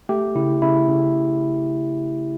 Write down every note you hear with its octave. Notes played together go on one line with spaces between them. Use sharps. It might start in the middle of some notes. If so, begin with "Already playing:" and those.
A3 G4
C#3 E4
C#3 E4
C#3